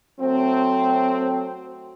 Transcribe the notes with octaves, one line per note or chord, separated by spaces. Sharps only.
F#3 A3 C4